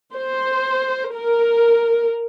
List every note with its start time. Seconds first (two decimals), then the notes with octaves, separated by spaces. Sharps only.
0.12 C5
1.12 A#4